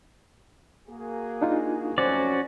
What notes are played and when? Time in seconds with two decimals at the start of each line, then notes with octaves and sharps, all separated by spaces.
0.88 A#3 F#4 G#4
1.41 D4 D#4 F4
1.98 F2 F#3 A3 C#4 F#4 C5 D5